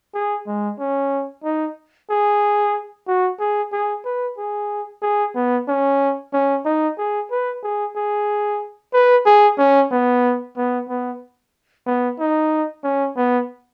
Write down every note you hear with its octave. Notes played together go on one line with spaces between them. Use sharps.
G#4
G#3
C#4
D#4
G#4
F#4
G#4
G#4
B4
G#4
G#4
B3
C#4
C#4
D#4
G#4
B4
G#4
G#4
B4
G#4
C#4
B3
B3
B3
B3
D#4
C#4
B3